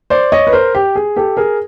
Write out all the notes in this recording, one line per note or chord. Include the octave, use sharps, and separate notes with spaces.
C5 D5
C#5 D#5
B4
A#4 C5
G4
G#4
G4 A4
G#4 A#4